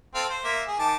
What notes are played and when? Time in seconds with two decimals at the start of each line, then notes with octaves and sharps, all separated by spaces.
0.15 C4 A4 F5
0.30 C5
0.44 A#3 E5
0.67 G#4
0.79 D#3 A5 D6